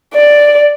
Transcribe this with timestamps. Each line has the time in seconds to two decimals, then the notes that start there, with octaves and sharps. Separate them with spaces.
0.14 D5